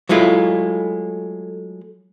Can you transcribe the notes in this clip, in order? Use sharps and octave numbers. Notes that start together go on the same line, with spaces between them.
F#3 G#3 A3 E4 F4